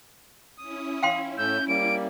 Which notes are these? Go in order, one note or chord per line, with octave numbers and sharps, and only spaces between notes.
C#4 E4 D#6
F5 G5 C6
A2 A3 E6 G6
G3 A#3 D7